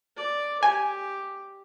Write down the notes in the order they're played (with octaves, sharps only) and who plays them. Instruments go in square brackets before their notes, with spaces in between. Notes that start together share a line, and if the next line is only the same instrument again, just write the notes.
[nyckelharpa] D5
[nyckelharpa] G4 [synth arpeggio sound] G#5